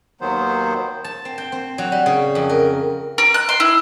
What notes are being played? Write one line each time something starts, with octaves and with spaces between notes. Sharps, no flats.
D#2 D#3 F#3 B3 C5
A5
C4
G5
C4
F#3
G3
C#3
F2
A#4
A#4
F#6
C6
E4